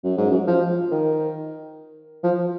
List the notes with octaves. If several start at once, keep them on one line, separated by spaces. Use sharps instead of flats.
F#2
G#2
F#2
F3
D#3
F3